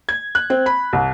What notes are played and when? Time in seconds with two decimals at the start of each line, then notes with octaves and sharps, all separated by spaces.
0.09 G#6
0.35 F#6
0.50 C4
0.66 B5
0.93 C2